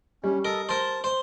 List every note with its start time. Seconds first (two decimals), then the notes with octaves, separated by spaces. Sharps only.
0.24 G3 C#4
0.45 A4 A#4 D#5
0.69 A#4 C5 A5
1.04 C5